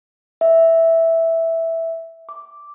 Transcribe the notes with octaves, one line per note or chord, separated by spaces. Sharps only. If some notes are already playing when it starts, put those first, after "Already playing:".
E5
D6